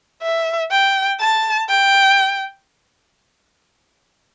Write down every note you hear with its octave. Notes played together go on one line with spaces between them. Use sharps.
E5
G5
A5
G5